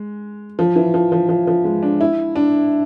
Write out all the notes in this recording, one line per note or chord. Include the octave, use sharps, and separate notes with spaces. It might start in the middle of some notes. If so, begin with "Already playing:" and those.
Already playing: G#3
F3
E3
F3
F3
F3
F3
G#3
D4
E4
D4